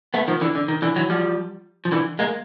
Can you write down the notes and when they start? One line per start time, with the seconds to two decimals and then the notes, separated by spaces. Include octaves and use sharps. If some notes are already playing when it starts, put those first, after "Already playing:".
0.14 A3 B3
0.28 D#3 F3
0.41 D3 E3
0.55 D3
0.68 D#3
0.82 D3 E3
0.96 E3 F#3
1.10 F3 G3
1.85 F3
1.92 D3 E3
2.19 G#3 A#3